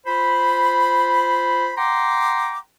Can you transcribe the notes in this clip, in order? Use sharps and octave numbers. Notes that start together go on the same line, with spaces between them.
F4 C5 B5
F#5 G5 A#5 C6 D6